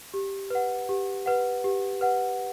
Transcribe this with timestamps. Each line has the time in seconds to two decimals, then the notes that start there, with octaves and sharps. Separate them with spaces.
0.14 G4
0.50 B4 F#5
0.89 G4
1.26 B4 F#5
1.64 G4
2.01 B4 F#5